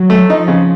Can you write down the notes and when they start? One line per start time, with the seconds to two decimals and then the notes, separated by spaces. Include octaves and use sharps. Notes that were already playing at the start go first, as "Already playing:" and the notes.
Already playing: F#3
0.10 A3
0.29 F3 D#4
0.48 C#3